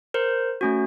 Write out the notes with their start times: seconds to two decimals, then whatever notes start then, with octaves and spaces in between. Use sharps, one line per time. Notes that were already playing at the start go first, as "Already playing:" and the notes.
0.14 A#4 C5
0.61 A3 C#4 F#4